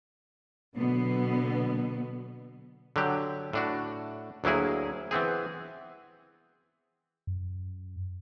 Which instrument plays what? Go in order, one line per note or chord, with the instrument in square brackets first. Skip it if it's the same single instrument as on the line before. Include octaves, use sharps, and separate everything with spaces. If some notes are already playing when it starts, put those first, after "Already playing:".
[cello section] B2 D3 F#3 B3
[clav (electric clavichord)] D3 F#3 G4
A2 D4 F#4
D2 F#3 A#3 E4 G#4
E3 B3 C4 G#4
[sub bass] F#2